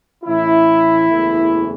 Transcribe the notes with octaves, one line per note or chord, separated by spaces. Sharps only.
A2 E3 A3 C#4 E4
F#1 E2 E3 A3